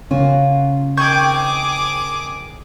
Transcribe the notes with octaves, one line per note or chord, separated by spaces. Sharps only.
C#3 A#3 C#4 F4 F#4
D#3 C4 G#4 C#6 D6 G6 G#6